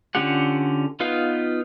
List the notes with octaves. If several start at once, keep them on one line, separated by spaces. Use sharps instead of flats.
D3 C#4 F4 G4 F#5
B3 D#4 F4 B4 F5